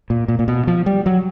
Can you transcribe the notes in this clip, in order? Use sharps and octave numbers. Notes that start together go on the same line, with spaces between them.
A#2
A#2
A#2
B2
F3
G3
F#3